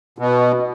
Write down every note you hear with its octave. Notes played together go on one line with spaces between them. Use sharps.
B2